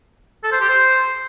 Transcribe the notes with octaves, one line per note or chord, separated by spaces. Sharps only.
A4
C5
G4
C5